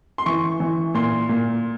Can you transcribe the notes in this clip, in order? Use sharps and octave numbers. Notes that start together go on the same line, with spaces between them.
C6
E3 C#6
E3
A#2 C6
A#2